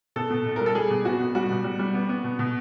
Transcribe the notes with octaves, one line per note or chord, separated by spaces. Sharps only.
B2 A4
B2
B1
A#4
G3
A4
G3 G#4
B2
B3 F#4
B1
G3 F#4
B2
G3
G3
B3
B3
B2
B2